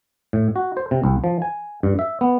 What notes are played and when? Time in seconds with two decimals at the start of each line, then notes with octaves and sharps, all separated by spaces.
0.33 A2
0.56 F#4
0.77 C5
0.91 C3
1.04 C2
1.24 F3
1.42 G#5
1.83 G2
1.99 E5
2.21 B3